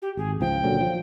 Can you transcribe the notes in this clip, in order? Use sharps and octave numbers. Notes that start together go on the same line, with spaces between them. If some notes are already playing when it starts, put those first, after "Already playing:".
G4
G#1 G#4
C#2 F3 G5
A#2 D3 F#3
F3